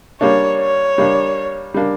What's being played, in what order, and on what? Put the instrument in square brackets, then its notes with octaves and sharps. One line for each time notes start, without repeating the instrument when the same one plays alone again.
[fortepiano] G3 A#3 D4 [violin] C#5
[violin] C#5
[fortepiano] G3 A#3 D4
G3 A#3 D4